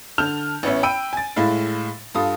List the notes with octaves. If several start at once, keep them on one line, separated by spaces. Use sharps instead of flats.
D3 A5 F6 G6 F7
A1 B3 C#4 E5
G5 B5 E6 D7 D#7
G#5 A6
A2 G#3 E4 F5
G2 F4 A4 D#6